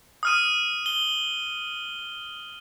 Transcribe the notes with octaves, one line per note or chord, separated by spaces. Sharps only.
D#6 F6 D#7
G7